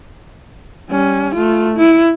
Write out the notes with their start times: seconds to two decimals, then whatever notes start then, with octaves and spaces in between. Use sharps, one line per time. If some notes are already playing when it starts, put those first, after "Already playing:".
0.89 G3 C#4
1.35 A3 F4
1.77 E4